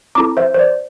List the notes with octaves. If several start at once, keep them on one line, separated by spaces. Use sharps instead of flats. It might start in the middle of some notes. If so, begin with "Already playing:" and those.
C4 E4 A4 A#5 D6
C5 E5
C5
D5